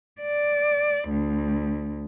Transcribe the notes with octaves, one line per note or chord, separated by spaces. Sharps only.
D5
D2